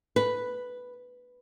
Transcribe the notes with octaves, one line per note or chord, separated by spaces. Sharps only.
B4